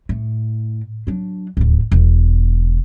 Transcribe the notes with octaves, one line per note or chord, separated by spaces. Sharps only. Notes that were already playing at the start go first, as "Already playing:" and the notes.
A2
F#3 D4
D1 D#2
E1